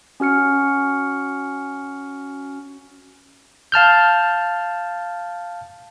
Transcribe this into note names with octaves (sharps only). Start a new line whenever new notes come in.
C#4 F#4 F6 C#7
F5 A5 F6 G6